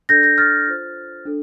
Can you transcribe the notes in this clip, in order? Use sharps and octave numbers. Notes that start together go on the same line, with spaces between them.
D4 A4 D5 G6 A#6
G6 A#6
F6 A6
F4 C5
D4 A4